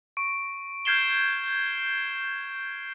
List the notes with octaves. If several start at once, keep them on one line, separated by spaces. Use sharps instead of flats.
C#6 D7
F6 G6 G#6 C7 E7 G7